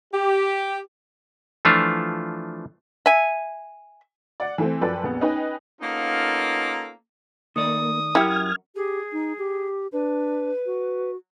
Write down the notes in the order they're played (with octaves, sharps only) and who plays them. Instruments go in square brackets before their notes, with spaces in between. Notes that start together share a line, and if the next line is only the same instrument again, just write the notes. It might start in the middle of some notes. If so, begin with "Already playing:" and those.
[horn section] G4
[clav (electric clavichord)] E3 F3 A3 D4 F4
[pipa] E5 G#5
[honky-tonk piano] D5 F#5
E3 A3 C4
F#2 F3 A4 B4 D5 G5
A#1 F2 B3
C#4 D#4 B4 D#5 G5 G#5
[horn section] A#3 B3 C#4 D#4 F4 A4
[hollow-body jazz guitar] D#3 A3 D5 [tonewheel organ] A#3 [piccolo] D#6
[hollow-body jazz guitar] F#2 A#4 F#5 [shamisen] E4 G4 [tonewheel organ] F6 G#6
[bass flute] G4 [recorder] G#4
[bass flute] D#4
G4
[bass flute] D4 [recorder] B4
[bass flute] F#4